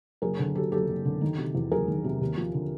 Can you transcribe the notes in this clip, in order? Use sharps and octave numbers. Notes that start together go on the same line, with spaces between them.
F#1 G#4 A#4
D3
F#2 G4 A4
F#1 G4 A4
F#1
D3
D#3
C3
E2
F#1 G#4 A#4
D#3
C3
D#2
F3
D3